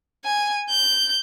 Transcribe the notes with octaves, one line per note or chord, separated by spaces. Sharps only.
G#5
G6